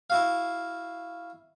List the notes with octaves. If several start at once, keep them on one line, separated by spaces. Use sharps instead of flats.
E4 F#4 F5